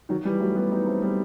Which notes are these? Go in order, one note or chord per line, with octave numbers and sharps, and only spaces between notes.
D#3 F#3
E3 G3
F#3 A3
G3 B3
B3 D#4
A3 C4
G3 B3